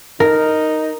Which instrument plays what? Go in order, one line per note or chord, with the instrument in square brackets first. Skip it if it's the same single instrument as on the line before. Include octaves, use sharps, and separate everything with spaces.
[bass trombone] D#4 [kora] A#4